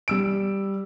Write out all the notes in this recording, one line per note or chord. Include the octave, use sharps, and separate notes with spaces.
G3 E6 D7